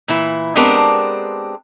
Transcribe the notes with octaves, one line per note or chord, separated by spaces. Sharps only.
A#2 E3 E4
G#3 B3 C4 D4 G4 A#4